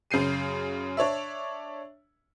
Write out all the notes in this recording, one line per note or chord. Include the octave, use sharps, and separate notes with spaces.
F#2 C#3 G6 C7 D#7
D4 C#5 D5 E5